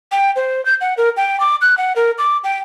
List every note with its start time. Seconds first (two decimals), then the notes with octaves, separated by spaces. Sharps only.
0.12 G5
0.36 C5
0.65 G6
0.81 F#5
0.97 A#4
1.17 G5
1.40 D6
1.61 F#6
1.78 F#5
1.96 A#4
2.18 D6
2.44 G5